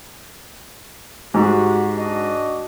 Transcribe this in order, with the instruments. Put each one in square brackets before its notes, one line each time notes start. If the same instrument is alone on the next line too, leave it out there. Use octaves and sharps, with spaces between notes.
[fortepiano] G#2 [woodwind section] F#4 G4
[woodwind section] D4 F#4 D#5